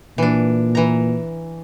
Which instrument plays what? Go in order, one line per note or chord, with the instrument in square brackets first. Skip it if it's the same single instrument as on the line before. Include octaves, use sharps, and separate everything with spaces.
[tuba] A#2 [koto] E3 D4
[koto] E3 A#5